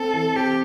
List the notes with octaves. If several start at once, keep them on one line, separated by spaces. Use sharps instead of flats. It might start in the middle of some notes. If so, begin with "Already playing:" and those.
Already playing: C4 A4
E3
C4 G4